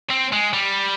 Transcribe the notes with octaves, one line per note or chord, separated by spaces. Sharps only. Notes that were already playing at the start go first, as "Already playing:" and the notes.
C4
G#3
G3